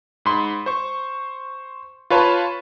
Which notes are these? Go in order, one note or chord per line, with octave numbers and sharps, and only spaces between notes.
G#2 B5 C6
C5 C#6
F4 B4 C#5 A5 B5 C6